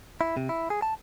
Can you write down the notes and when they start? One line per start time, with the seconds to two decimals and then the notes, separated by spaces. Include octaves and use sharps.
0.21 E4
0.37 C3
0.49 E4
0.70 G#4
0.82 A5